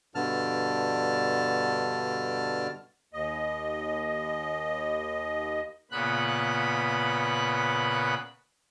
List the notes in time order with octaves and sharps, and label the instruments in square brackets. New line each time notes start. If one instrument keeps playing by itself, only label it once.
[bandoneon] G2 B2 D3 A5 F6
[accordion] D#2 D#5
[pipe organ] A#2 C#3 B3 B5 F#6